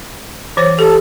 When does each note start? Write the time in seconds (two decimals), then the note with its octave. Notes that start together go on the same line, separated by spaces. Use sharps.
0.57 E3 C5 C#5
0.79 G4 A4